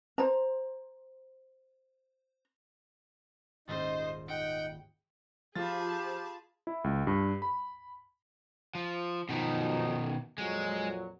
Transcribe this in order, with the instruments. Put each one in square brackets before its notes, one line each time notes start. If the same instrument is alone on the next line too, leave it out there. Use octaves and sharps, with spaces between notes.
[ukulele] C5 A#5
[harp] D#1 G#2 A6 [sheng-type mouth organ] D#4 [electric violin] C5 D#5
[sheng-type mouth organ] D#4 F#5 [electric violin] G5 D7
[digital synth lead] F3 [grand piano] F4 A6 [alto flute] G4 [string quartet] G#4 A5 B5
[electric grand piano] E4
C#2
G2
B5
[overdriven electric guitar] F3
[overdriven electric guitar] B2 D#3 [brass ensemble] F3 F#3 D#4
[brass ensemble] F2 A#2 F#3 [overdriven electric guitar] G#3